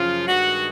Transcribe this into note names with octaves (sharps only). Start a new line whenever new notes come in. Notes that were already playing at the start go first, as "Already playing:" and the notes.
Already playing: F#2 C#3 F3 F4
G2 D#3 G#3 F#4